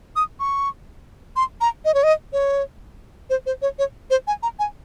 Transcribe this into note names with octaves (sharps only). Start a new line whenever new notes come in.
D#6
C#6
C6
A#5
D#5
C#5
D#5
C#5
C5
C5
C#5
C#5
C5
G#5
A#5
G#5